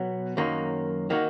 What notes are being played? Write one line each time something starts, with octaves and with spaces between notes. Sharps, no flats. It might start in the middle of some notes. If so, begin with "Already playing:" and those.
Already playing: B2 F#3 B3
F#2 D#3 F#3 A#3
D#3 A#3 D#4 F#4